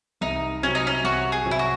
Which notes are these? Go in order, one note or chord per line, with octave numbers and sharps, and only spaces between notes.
C2 D#4
C3 F#3 C#4
D#4
C#4
C2 F#4
G#4
C3 F#3
E4
F#4